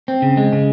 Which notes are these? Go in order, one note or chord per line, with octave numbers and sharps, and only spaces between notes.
C4
C#3
G#3
C#3